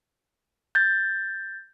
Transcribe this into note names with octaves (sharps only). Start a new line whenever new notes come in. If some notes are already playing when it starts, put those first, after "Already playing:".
G6 A6